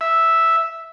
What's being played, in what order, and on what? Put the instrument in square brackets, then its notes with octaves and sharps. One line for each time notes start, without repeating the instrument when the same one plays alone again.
[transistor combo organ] E5